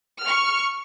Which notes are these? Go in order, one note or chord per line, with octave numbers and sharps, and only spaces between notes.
C#6 F6